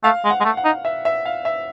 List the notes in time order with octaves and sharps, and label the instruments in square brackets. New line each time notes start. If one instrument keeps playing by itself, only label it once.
[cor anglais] A3 [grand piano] F5
[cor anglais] G#3
[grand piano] F#5
[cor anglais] G#3
A3
[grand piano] F#5
[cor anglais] D#4
[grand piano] E5
E5
F5
E5